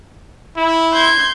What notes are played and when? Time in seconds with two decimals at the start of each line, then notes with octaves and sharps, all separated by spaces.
0.57 E4
0.93 C6 G6 G#6